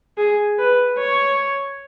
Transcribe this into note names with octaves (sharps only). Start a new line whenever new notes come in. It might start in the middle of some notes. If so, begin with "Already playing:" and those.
G#4
B4
C#5